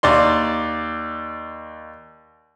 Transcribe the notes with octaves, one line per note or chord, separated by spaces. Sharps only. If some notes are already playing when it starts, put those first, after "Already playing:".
D#2 D5 C6